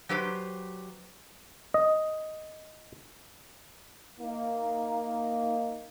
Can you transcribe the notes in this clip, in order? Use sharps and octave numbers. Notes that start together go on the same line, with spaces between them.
F#3 G4 B4 C5
D#5
A#3 D#4